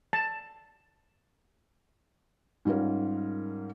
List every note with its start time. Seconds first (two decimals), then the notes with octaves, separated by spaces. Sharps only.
0.13 A5
2.65 G#2 G3 C#4 F4 A#4